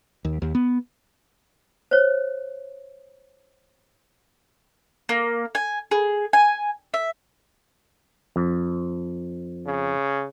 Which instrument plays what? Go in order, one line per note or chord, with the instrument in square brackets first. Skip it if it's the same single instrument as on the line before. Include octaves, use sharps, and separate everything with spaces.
[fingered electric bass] D#2
D#2
B3
[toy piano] C5 C#5
[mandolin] A#3
G#5
G#4
G#5
E5
[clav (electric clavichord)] F2
[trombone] C#3